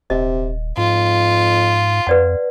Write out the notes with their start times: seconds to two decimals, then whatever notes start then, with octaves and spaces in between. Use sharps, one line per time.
0.10 D#1 C3 D#5
0.77 F2 G#2 F4
2.07 F2 B4 D5 F#5